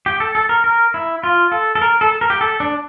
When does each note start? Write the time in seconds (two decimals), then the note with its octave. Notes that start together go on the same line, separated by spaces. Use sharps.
0.06 G4
0.20 A4
0.35 A4
0.49 A#4
0.64 A#4
0.94 E4
1.24 F4
1.52 A4
1.75 A4
1.82 A#4
2.01 A4
2.21 A#4
2.30 G4
2.41 A4
2.60 D4